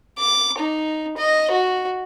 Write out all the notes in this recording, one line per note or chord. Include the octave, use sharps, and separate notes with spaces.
D6
D#4
D#5
F#4